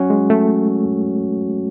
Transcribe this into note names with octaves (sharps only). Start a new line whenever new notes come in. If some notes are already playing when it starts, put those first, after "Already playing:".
Already playing: F#3 C#4 F#4
G#3
A3